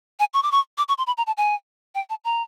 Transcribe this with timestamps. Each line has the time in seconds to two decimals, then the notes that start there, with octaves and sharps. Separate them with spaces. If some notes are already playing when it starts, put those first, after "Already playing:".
0.19 G#5
0.34 C#6
0.43 D6
0.52 C#6
0.78 D6
0.88 C#6
0.98 C6
1.07 B5
1.17 A#5
1.27 A5
1.37 G#5
1.95 G5
2.10 A5
2.24 A#5